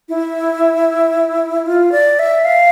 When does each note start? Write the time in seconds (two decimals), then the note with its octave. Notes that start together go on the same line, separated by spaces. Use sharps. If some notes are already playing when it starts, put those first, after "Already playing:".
0.09 E4
1.66 F4
1.92 D5
2.19 E5
2.45 F5